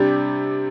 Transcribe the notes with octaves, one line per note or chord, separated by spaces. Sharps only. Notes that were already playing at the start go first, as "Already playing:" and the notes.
Already playing: C3 G3 D4 G4